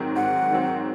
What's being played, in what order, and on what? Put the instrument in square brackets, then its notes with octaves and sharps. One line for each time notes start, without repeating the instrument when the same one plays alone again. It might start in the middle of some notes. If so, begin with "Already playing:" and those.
Already playing: [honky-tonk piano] G#2 D#3 F#3 C4
[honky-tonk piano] G#2 [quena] F#5
[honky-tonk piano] D#3 F#3 C4